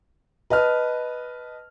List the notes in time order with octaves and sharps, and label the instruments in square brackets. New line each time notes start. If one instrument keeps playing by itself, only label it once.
[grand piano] B4 D#5 A5 F6